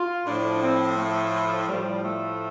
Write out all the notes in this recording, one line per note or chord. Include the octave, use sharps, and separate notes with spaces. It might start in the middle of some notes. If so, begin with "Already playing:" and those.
Already playing: F4
A2 F3 D4
C4
A3
A2 F3 G3
A3